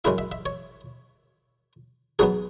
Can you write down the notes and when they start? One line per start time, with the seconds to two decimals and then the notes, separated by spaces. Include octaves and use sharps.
0.05 F#2 C#3 G#3 E4 E5
0.18 E5
0.32 E5
0.46 C#5
2.19 G#2 F#3 B3 G#4